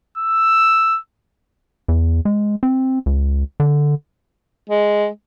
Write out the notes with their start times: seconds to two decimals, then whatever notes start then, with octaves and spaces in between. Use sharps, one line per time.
0.18 E6
1.88 E2
2.25 G#3
2.63 C4
3.06 C#2
3.60 D3
4.70 G#3